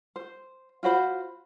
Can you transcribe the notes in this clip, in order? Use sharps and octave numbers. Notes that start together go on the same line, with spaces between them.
C5
F4 F#4 C5 B5